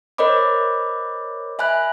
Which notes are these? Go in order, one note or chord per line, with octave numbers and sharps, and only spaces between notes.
A#4 C5 C#5 D#5 B5 D6
E5 G#5 B5 F#6